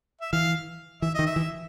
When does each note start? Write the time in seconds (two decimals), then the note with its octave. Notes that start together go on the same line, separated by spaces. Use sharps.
0.21 E5
0.33 E3 F5
1.02 E3 E5
1.15 D#3 D#5
1.26 E5
1.36 E3